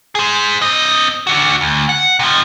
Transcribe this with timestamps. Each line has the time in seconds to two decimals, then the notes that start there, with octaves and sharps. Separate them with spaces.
0.15 G#4 C5
0.62 C4 D#5
1.27 D3 F#4
1.61 D2
1.89 F#5
2.19 C3 F3